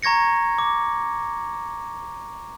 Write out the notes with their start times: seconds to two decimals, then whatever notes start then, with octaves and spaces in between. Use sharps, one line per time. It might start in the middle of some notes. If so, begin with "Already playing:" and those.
0.03 A#5 C#6 G#6 A#6 C#7
0.58 D6